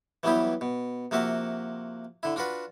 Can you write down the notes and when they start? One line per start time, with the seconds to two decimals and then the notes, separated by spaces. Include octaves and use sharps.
0.23 E3 F#3 G3 B3 E4 G4
0.61 B2
1.11 C3 F3 A#3 F#4 E5
2.23 D3 E4
2.36 D4 F4 F#4 B4